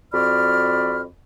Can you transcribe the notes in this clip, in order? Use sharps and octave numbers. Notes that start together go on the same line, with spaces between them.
F2 F#4 D5 B5 F6